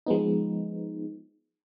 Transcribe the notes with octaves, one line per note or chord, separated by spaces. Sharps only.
F3 G#3 B3 D#4